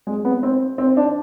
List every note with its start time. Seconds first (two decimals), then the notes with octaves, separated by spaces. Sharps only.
0.07 G#3
0.25 B3
0.43 C4
0.78 C4
0.97 D4